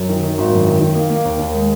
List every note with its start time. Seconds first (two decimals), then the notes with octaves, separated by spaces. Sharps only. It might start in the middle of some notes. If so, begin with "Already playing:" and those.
Already playing: F#2
0.09 D#3
0.23 D#3
0.38 G#1
0.53 F#2
0.67 D#3
0.81 D#3
0.95 A#3
1.10 A#3
1.25 D#2
1.39 D#2
1.55 G#3